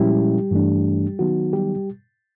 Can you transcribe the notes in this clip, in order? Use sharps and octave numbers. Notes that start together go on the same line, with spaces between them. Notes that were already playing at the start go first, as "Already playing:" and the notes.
Already playing: A#2 F3 G3 G#3 C#4 E4 G4
G2 E3 A3 D4
D#3 F#3 B3 D#4 F#4
G3 G4